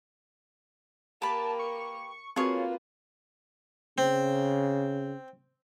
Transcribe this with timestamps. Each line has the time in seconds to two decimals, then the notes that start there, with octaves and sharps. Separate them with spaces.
1.22 A#3 G4 A#4 B4 A5 B5
1.59 C#6
2.36 A#3 C4 F4 F#4 G#4 B4 C#5
3.98 C#3 C4